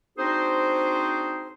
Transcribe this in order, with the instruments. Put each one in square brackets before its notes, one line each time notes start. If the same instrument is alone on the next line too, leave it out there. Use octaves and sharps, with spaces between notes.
[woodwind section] C4 D4 D#4 F#4 G#4 C5